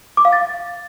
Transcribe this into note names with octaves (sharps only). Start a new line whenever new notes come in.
D6
F5
A6